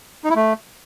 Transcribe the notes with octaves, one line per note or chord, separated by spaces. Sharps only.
D#4
E4
A3